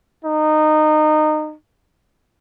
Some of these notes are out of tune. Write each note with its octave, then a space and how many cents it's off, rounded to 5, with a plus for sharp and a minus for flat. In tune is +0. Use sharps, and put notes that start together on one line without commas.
D#4 -20